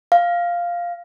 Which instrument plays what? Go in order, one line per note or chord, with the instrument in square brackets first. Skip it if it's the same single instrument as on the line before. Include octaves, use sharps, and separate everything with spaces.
[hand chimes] F5